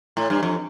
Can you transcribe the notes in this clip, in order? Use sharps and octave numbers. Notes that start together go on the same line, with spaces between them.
A2
G2
F2